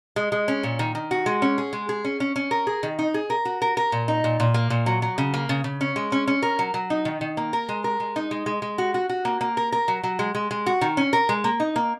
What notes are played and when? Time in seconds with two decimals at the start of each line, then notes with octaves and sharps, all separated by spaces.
0.16 G#3
0.32 G#3
0.48 C#4
0.63 A#2
0.79 D#3
0.95 D#3
1.11 F#4
1.26 G#3
1.42 C#4
1.58 G#4
1.73 G#3
1.89 G#4
2.05 C#4
2.20 C#4
2.36 C#4
2.51 A#4
2.67 G#4
2.83 D#3
2.99 D#4
3.14 G#4
3.30 A#4
3.45 F#4
3.62 A#4
3.77 A#4
3.92 A#2
4.08 D#4
4.24 A#2
4.40 A#2
4.54 A#3
4.70 A#2
4.86 F#3
5.02 F#3
5.18 C#3
5.34 A#3
5.49 C#3
5.64 C#3
5.81 C#4
5.96 G#3
6.12 C#4
6.27 C#4
6.42 A#4
6.59 F#3
6.74 F#3
6.90 D#4
7.05 D#3
7.21 D#3
7.37 A#3
7.53 A#4
7.69 G#3
7.84 A#4
8.00 G#3
8.16 D#4
8.31 G#3
8.46 G#3
8.62 G#3
8.78 F#4
8.94 F#4
9.09 F#4
9.25 A#3
9.41 A#3
9.57 A#4
9.72 A#4
9.88 F#3
10.03 F#3
10.19 G#3
10.35 G#3
10.51 G#3
10.66 F#4
10.81 D#3
10.97 C#4
11.13 A#4
11.29 G#3
11.44 A#3
11.60 D#4
11.76 A#3